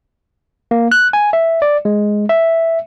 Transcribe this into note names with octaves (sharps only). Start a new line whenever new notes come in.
A#3
F#6
G#5
E5
D5
G#3
E5